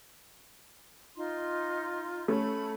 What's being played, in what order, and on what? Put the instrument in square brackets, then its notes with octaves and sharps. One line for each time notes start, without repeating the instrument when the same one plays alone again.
[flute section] D#4 F4 C6
[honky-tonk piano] A3 C#4 [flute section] A5 B5